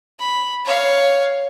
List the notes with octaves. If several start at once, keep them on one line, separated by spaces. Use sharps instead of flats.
B5
C#5 F5